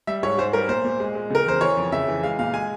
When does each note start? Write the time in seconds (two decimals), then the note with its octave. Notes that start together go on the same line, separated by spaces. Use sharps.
0.07 G3 E5
0.23 G#2 C#5
0.38 G#2 C5
0.53 G3 A#4
0.69 A#2 C5
0.85 A#2
1.00 G#3
1.15 G#3
1.30 C#3 A#4
1.46 E2 C5
1.61 E3 C#5
1.77 F2
1.92 C#3 E5
2.08 E3
2.23 G#3 F5
2.39 A#2 F5
2.54 G#3 G#5